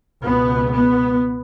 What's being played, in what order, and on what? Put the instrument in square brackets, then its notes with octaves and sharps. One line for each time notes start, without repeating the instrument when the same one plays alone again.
[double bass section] C#2 B2 B3
B3